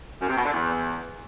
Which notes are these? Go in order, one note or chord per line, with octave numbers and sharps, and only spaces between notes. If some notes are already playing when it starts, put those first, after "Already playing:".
F#2
C3
B2
D3
E2